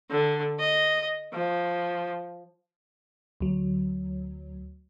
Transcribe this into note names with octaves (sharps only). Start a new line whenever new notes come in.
D3
D#5
F3
D2 F#3